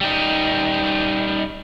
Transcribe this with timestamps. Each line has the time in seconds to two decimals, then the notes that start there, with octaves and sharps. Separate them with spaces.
0.01 G3 D#4